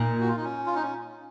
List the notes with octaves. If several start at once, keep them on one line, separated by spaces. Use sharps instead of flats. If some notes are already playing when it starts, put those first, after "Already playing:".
Already playing: A#2 D#4
F#4
F4
D#4
C#4
F4
D#4
C#4